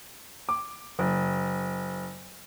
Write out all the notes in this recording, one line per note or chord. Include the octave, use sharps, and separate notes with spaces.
D6
F#1